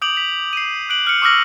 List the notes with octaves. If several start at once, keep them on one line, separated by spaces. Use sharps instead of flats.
D6 D#6 G6 D7 F7 F#7
B6 F7
C7 D#7
F#6 D7 F#7
F6 C#7
C#6 D6 E6 F6 A#6 F#7